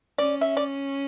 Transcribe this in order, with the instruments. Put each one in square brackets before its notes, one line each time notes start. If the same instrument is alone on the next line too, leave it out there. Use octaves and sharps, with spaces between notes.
[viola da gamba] C#4 [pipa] D5
[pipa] E5
D5